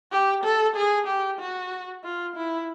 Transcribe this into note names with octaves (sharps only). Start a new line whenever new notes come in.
G4
A4
G#4
G4
F#4
F4
E4